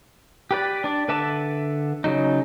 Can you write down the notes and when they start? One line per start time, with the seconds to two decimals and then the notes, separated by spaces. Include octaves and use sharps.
0.51 G4 B4 D5
0.84 D4 D5
1.08 D3 B4 E5 A5 D6
2.04 C#3 F#3 D#4